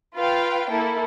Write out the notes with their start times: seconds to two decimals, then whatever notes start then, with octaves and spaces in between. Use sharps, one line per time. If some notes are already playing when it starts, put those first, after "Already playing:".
0.15 F4 B4 F5 G5
0.70 A#3 E4 A4